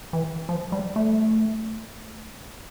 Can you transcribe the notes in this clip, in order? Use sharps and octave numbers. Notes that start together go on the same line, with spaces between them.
E3
F3
G3
A3